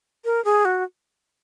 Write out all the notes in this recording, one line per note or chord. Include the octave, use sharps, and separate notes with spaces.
A#4
G#4
F#4